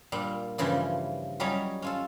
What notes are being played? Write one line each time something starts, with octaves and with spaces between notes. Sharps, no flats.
A#2 G3 D4 F5
G2 C#3 E3 F3 G3
F#3 G3 C#4 D#4 G4 C#5
C#4 F4 A4